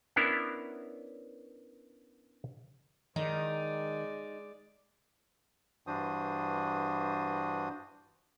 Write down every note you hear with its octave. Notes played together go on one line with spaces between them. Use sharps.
B3 C#4 D4 E4 A#4
D#3 G#3 D#4 D5
G2 E3 D4 F#4 C5 D#6